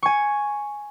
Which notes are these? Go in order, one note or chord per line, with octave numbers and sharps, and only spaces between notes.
G#5 C#6